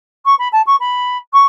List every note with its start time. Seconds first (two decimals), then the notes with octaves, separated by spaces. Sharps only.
0.25 C#6
0.39 B5
0.52 A5
0.66 C#6
0.80 B5
1.33 C#6